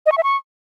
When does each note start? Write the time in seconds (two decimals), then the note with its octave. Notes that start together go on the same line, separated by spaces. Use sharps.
0.06 D#5
0.12 C#6
0.18 E5
0.23 C#6